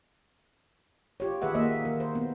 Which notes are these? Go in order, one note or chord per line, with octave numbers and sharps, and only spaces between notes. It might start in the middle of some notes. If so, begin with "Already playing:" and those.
F4 G4 C#5
D#3 G#4 B4 E5 F#5
A#3 C5 D#5 E5
D#3 A#4
C5
B3